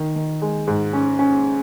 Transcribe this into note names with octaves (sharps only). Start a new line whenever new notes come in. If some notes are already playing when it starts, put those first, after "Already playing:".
Already playing: D#3
D#3
G#3
G#2
C#4
C#4